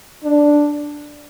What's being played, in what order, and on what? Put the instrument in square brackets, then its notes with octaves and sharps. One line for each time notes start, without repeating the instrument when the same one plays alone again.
[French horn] D4